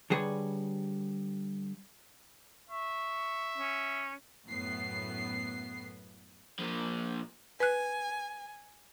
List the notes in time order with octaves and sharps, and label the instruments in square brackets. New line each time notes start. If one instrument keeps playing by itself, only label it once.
[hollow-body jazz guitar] D3 G3 G#4 B4 C#5
[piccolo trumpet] E5 [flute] C#6
[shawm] C#4
[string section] F#2 A2 B3 C7
[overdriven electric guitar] A#2 F3
[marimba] B4 F#6 [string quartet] G#5